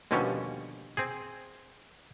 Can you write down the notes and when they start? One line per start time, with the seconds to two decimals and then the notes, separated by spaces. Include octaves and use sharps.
0.11 D#2 B2 D3 F3 G3 C#4
0.97 C4 G#4